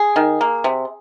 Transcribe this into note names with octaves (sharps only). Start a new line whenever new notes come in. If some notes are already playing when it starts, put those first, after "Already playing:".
Already playing: G#4
D#3
A#3
C3